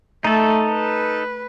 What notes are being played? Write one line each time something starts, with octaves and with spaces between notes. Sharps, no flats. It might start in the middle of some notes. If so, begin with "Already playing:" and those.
A3 D#4 A4
B4